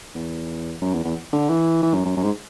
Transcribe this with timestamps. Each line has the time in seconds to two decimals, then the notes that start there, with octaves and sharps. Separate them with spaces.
0.15 E2
0.81 F#2
0.93 E2
1.04 E2
1.33 D3
1.49 E3
1.83 E3
1.94 F#2
2.05 F#2
2.17 F#2
2.23 G#2